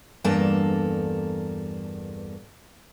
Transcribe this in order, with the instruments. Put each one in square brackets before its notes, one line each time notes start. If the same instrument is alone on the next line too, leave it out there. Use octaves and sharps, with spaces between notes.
[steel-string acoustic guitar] E2 G2 A#3 A4 A5